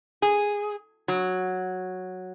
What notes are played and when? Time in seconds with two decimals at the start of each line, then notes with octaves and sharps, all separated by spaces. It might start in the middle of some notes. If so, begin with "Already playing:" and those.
0.22 G#4
1.08 F#3